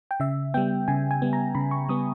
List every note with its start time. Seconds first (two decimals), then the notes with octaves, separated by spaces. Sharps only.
0.11 G5
0.20 C#3 E5
0.54 G3 B3 G5
0.88 C#3 G#5
1.11 G#5
1.22 G3 B3
1.33 A#5
1.55 C#3 B5
1.71 C#6
1.89 G3 B3 D#6